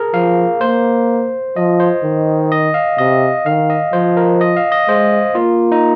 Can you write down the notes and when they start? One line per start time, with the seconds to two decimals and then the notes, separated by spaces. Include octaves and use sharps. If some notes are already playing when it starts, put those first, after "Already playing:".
Already playing: G#4 A#4
0.14 F3 F5
0.61 A#3 C5
1.56 F3 D#5
1.80 C5
2.03 D#3
2.52 D#5
2.74 F5
2.98 C3 D#5
3.46 D#3 F5
3.70 D#5
3.93 F3 C5
4.17 A#4
4.41 D#5
4.56 F5
4.72 D#5
4.88 G#3 C5
5.35 A#3 F4
5.72 D#4